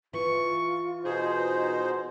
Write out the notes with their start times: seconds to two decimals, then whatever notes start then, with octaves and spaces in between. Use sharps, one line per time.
0.13 E3 F4 C#6
1.05 B2 D#4 G#4 C5